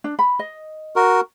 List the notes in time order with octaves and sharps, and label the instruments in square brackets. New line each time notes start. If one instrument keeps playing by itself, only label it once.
[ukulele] D4
B5
D#5
[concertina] F#4 A#4